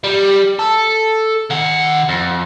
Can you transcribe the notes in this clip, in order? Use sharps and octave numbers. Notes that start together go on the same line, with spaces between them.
G3
A4
D#3 F#5
F2